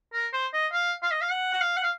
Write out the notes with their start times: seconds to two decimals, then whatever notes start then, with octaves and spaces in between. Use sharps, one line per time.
0.13 A#4
0.33 C5
0.53 D#5
0.72 F5
1.02 F5
1.11 D#5
1.21 F5
1.32 F#5
1.53 F#5
1.61 F5
1.77 F#5
1.83 F5